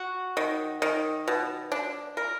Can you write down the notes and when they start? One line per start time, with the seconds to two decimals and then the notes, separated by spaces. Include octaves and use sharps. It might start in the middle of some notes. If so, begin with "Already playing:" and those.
Already playing: F#4
0.37 D#3
0.82 D#3
1.28 B2
1.72 D4
2.17 A#4